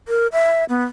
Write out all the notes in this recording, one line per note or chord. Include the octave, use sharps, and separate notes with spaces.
A#4
E5
B3